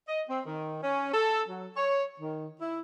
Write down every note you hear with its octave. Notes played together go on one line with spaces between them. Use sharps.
D#5
C4
D#3
C#4
A4
F#3
C#5
D#3
E4